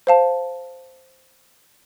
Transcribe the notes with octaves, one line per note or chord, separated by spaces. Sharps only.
C5 F5 A5